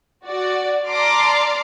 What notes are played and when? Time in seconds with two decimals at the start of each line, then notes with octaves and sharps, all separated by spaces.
0.24 F#4 D5
0.86 D5 A5 A#5 C6 D6 F6